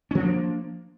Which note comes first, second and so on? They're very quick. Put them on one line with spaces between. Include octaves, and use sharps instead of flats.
C#4 F3 D4 A#3